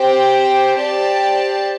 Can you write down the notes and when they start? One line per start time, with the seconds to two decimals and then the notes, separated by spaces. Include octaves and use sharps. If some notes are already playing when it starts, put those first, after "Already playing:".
Already playing: C4 G4 C5 G5
0.77 C4 G4 D5 A5